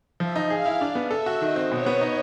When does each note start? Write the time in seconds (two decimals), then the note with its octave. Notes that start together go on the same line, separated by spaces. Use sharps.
0.20 F3 E5
0.36 D#4
0.50 G#4 F5
0.66 E4
0.81 D4
0.95 B3
1.11 A4 E5
1.26 F#4
1.41 D#3 D#5
1.56 C4
1.71 B2 C#5
1.86 B3
2.01 D#4